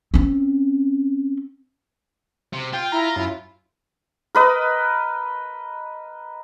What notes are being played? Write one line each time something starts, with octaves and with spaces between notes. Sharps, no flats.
C4 C#4
C3
F4 G5
E4 A#5
F#2 E4
A#4 B4 D#5